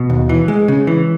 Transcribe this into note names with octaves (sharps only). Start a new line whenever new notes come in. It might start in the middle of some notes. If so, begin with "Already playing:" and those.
Already playing: B2
D#2
E3
G#3
C#3
E3